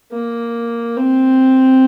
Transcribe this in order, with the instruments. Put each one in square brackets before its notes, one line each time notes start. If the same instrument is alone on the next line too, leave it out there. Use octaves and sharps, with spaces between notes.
[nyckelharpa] A#3
C4